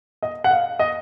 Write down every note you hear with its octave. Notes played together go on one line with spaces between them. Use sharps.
D#5
F#5
F5
D#5